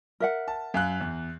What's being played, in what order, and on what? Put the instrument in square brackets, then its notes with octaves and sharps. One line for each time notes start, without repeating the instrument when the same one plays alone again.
[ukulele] A#4 E5 F#5
[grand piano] A5
F#2 F5 F#6
E2